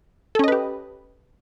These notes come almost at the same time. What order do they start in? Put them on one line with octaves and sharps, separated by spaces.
A4 C#4 D#5 B4 G4